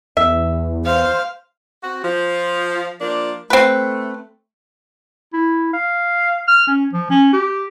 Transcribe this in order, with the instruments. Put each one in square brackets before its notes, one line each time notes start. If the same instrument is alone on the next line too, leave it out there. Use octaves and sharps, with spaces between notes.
[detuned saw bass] E2 [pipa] E5
[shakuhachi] C5 [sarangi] F5
[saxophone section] C4 F#4
F3
F3 A#3 D4
[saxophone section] A3 [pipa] C4 B4
[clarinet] E4
F5
F6
C#4
F3
C#4
G4